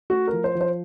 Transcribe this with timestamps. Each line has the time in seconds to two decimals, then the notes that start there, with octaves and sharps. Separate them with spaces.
0.10 A3 F#4
0.27 A#4
0.33 F3
0.44 C5
0.55 F3
0.61 C5